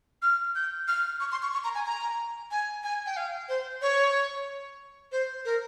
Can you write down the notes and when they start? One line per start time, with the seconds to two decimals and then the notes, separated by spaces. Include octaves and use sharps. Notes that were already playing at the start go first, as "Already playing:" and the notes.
0.22 F6
0.55 G6
0.88 F6
1.20 C#6
1.32 C6
1.43 C#6
1.53 C#6
1.64 A#5
1.75 G#5
1.86 A#5
2.51 G#5
2.84 G#5
3.06 G5
3.17 F5
3.49 C5
3.82 C#5
5.12 C5
5.45 A#4